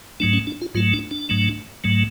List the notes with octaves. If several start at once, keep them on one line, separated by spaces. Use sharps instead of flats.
G#2 F#3 A3 D4
C#4
D4
F4
G#2 F#3 A3 F4
D4
D4
G#2 F#3 A3
G#2 F#3 A3